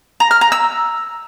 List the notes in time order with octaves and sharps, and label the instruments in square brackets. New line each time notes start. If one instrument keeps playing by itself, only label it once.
[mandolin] A#5
F6
A#5
E6